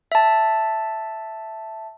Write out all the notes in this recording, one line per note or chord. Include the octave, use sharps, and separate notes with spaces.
E5 A5